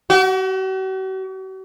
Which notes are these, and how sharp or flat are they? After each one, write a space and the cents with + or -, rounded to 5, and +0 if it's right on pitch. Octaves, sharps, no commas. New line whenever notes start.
F#4 +45